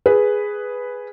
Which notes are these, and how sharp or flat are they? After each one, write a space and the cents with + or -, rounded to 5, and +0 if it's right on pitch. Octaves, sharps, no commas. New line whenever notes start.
G#4 +0 B4 +0